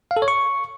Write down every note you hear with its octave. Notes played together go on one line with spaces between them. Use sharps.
F5
A4
C#5
C#6